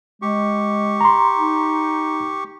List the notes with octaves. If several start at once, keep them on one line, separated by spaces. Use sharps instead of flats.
G#3 G4 C#6
A#5 C6
D#4